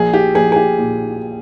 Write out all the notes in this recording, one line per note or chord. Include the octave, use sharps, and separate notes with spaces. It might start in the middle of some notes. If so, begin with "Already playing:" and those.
Already playing: A#1 G#4
G4
A#1 G#4
G#4
G4
A#2